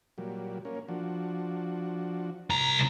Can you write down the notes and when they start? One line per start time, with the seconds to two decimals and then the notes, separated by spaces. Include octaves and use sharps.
0.18 A#2 F#3 G3
0.65 A#3 C#4
0.88 F3 D4 F#4
2.50 C2 A#5